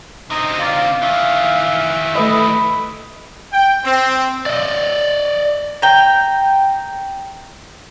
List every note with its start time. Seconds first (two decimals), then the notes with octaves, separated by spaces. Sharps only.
0.30 D3 C4 D#4 D#5
0.60 F4 D5 F5
1.02 D#3 E3 E5
2.15 A3 B4 D#5 B5
3.52 G5
3.84 C4
4.46 D5 D#5
5.82 G5 A#5